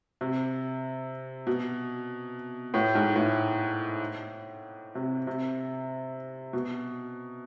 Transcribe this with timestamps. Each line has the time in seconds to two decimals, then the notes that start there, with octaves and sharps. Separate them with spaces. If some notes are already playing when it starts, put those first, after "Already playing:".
0.21 C3
1.47 B2
2.74 A2
2.95 G#2
3.16 A2
4.95 C3
5.27 C3
6.53 B2